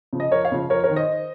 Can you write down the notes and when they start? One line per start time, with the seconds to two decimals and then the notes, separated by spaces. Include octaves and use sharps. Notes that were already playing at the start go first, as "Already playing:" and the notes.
0.13 C#3 F3
0.20 D#5
0.32 F2 A#4 C#5
0.45 C#5 F5
0.52 C#3 F3
0.70 F2 A#4 C#5
0.84 A#4 C#5
0.90 D#3
0.96 C5 D#5